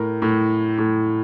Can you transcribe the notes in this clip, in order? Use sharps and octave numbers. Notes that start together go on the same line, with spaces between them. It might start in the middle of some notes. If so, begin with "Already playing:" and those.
Already playing: A2 A#4
A2
A2